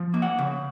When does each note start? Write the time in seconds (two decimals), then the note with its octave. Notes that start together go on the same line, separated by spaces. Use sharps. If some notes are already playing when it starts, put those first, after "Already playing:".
Already playing: F3
0.14 A#3
0.22 F#5
0.39 C#3